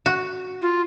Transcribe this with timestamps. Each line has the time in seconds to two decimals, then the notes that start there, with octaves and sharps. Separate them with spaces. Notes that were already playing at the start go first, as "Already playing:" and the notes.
0.06 F#4
0.62 F4